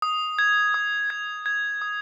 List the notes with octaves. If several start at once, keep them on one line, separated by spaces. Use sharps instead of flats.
D#6
G#6
D#6
G#6
G#6
D#6